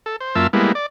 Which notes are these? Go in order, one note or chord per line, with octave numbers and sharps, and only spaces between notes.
A4
C5
F#2 A#3 F4 E5 A5 E6
G3 G#3 A#3 B3 E4
D5